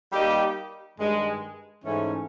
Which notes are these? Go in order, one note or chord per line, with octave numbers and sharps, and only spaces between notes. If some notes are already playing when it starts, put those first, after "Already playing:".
G3 A#3 D#4 G4
G2 D#3 G#3
G#2 E3 A3 C#4